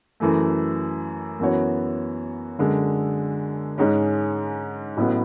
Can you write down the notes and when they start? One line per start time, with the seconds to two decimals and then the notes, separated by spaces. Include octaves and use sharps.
0.20 F#2 E3 A3
1.39 F#2 E3 B3 F#4 C#5
2.58 F#2 D3 G#3
3.78 G#2 G#3 C#4
4.97 A1 A2 F#3 B3